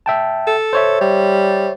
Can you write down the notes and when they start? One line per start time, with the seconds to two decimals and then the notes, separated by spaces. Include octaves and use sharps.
0.06 E5 G5 A5
0.47 A4
0.73 C5 C#5 E5
1.01 G3